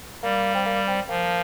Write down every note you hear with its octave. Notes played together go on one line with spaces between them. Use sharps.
G3 A#3
C4
A#3
C4
F3 A#3